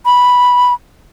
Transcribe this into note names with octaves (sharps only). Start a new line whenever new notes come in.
B5